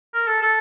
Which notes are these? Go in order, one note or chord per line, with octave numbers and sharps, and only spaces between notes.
A#4
A4
A4